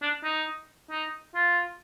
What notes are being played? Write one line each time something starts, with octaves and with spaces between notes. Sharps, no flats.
D4
D#4
D#4
F4